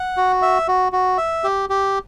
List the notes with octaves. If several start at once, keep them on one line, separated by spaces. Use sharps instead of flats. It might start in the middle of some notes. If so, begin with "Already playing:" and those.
Already playing: F#5
F#4
E5
F#4
F#4
E5
G4
G4